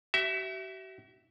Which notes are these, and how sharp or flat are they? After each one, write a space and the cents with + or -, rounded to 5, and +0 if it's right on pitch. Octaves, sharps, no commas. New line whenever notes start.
F#4 +45 E5 +0